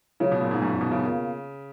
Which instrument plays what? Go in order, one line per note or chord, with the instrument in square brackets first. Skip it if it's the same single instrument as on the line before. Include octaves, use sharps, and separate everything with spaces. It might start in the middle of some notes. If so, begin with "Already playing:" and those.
[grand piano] C#3 [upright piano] F#3 C#4 F4
[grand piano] B2
A#2
G#2
F#2
G#2
B2
C#3
[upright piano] B2 A#3 F4